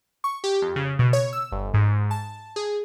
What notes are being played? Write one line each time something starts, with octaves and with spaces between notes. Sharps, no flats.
C#6
G4
F2
C#3
B2
C#5
E6
G1
G#2
A5
G#4